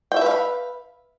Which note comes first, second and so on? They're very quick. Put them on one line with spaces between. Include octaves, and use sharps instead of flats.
G5 E5 B4 F5 B5